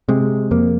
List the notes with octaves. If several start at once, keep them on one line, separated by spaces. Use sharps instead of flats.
C3 G#3
F2 A#3